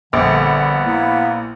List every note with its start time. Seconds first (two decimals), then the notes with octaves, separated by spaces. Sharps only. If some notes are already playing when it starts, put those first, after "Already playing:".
0.13 A#1 D3 G3 B3
0.85 A#3 E4